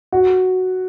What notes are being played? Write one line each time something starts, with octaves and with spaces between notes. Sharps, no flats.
F#4